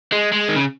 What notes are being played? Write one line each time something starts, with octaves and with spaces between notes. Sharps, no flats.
G#3
G#3
D#3
C#3